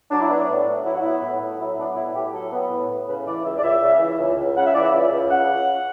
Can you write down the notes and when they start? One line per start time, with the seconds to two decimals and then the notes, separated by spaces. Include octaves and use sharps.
0.11 F#3 D4
0.20 E4
0.30 B3 D4
0.48 A2
0.66 A2
0.85 F#3 E4
0.93 F#4
1.01 B3 E4
1.22 A2
1.40 A2
1.59 F#3 E4
1.77 B3 D4
1.96 A2 E4
2.15 A2 G4
2.33 F#3 A4
2.52 B3
2.71 A2
2.89 A2
3.07 C#3 B4
3.26 E3 D5
3.44 C#2 E5
3.58 D5
3.63 C#2 E5
3.82 C#3
4.00 E3
4.19 C#2
4.37 C#2
4.56 C#3 F#5
4.65 E5
4.74 E3 D5
4.83 E5
4.93 C#2
5.11 C#2
5.30 C#3 F#5